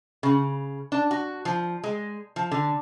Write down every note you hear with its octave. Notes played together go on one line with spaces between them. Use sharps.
C#3
D4
F#4
F3
G#3
F3
D3